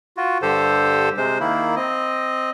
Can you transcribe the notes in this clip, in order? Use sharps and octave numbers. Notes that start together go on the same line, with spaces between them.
F4 F#4
G2 D3 G4 A4 C5
C3 G#3 C5
D#3 A#3 E4
C4 D#5